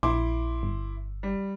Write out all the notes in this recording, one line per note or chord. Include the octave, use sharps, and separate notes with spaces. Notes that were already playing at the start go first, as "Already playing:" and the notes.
A#1 E4 C6 D6
G1
G3